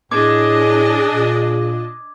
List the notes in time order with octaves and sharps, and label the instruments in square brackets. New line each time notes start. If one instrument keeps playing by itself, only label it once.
[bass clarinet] A2 [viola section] D4 D#5 [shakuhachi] G#4 [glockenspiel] D6 G#6
[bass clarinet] A#2